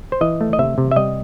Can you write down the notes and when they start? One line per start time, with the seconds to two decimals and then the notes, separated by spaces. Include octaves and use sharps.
0.12 C5
0.21 E3 D#5
0.41 A3
0.53 D#5
0.59 C3 E5
0.78 C3
0.91 E5
0.96 G3 D#5